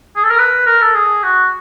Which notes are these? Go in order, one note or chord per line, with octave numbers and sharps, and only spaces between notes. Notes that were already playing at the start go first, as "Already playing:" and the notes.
G#4
A4
A#4
B4
A#4
A4
G#4
F#4